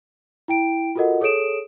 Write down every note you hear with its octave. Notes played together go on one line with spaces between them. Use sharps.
E4 G5 D7
F4 F#4 A4 A#4 D#5 F#5
G#4 A4 C#5 D#6 D7 E7